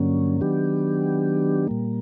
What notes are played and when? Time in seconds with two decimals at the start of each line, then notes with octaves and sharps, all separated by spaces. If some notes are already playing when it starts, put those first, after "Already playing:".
Already playing: G2 D3 F#3 A#3 C#4
0.41 D#3 F#3 B3 D4 G4
1.68 A#2 G3 A#3